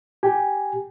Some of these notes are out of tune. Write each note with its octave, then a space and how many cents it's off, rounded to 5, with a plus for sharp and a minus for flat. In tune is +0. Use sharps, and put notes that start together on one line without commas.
G4 +0 G#5 +0